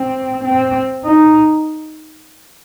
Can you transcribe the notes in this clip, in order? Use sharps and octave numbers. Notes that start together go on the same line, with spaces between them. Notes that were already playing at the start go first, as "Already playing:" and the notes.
Already playing: C4
C4
D#4